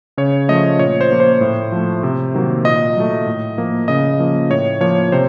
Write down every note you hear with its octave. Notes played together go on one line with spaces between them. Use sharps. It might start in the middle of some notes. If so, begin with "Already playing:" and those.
C#3 C#5
F3 A3 D#5
A#2 C#5
C5
F3 A#3
C5
A2
F3 A3
C3
D#3 F#3 A#3
A#2 D#5
F#3 A3
A2
F3 A#3
C#3 D#5
F3 A#3
A2 C#5
F3 A#3 C#5
C3 C5